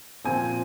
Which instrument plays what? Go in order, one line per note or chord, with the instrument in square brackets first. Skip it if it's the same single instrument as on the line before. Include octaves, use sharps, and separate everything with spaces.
[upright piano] A#2 F3 C4 G#5